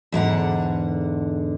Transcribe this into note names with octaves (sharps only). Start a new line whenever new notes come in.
E2 G#2 D3 F#5